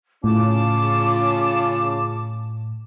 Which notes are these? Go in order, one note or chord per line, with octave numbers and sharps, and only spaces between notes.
A2 C#3 C#4 F4 A5 D6